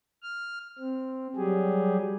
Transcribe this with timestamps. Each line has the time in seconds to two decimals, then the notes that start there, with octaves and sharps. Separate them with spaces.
0.23 F6
0.79 C4
1.36 F#3 G3 G4 G#4